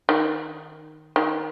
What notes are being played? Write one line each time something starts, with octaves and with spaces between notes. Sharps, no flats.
D#3
D#3